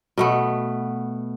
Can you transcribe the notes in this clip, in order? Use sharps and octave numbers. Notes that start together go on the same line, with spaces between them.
B2 A3 B3